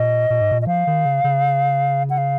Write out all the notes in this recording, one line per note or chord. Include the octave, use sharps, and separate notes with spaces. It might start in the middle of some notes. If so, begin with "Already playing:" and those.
Already playing: A#2 D#5
A#2
G#2
A#2
D#5
F3 F5
D#3
C#3
C#3
F#5
F5